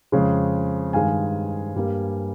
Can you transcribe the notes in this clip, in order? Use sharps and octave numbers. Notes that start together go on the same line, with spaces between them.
F2 C#3 G#3
G2 D#3 G#3 F5 G#5
G2 G3 A#3